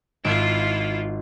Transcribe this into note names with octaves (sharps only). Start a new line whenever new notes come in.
G#1 E4 F4 D7 E7